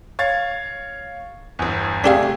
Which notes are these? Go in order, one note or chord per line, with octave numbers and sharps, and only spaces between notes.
C#5 F5 A6
G1 E2
C3 A3 D4 G4 G#4 F5